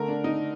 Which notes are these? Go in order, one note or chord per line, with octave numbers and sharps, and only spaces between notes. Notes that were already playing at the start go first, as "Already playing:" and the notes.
Already playing: D3 A3 A#4
D4
D#4